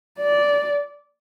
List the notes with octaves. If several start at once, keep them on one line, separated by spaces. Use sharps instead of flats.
D5